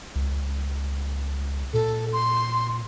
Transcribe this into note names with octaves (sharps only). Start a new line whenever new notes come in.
C#2
A#2 A4
C6